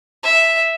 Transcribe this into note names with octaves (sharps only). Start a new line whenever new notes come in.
E5